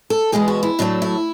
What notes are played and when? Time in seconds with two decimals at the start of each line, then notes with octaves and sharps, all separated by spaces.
0.10 A4
0.32 E2 B2 G#3 B3 G#4
0.48 F#4
0.63 E4
0.79 A2 F#3 A3 D4
1.02 E4